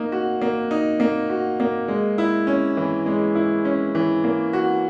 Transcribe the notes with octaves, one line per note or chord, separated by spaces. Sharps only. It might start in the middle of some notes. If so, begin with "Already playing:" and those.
Already playing: A#3 D#4
F#4
A#3
D#4
A#3
F#4
A#3
G#3
E4
C#4
E3
G#3
E4
C#4
E3
A#3
F#4